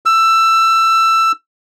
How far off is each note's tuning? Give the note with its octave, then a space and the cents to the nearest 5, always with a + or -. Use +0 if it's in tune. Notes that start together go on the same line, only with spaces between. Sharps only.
E6 +15